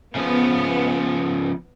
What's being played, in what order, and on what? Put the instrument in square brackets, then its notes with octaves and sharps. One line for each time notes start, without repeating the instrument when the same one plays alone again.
[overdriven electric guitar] C#3 F3 [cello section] B3